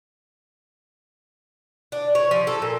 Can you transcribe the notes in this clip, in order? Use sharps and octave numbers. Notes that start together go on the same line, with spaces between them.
D4
C#5
F3
A4
A#2